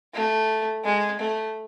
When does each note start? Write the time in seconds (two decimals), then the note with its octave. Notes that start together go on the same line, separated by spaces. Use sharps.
0.14 A3
0.84 G#3
1.20 A3